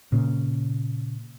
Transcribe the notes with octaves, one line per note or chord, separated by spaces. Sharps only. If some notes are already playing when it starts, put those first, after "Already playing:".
A#2 C#3